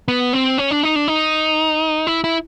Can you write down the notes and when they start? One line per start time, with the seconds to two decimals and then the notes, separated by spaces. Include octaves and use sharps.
0.08 B3
0.33 C4
0.58 C#4
0.71 D4
0.83 D#4
0.96 D4
1.08 D#4
2.07 E4
2.24 E4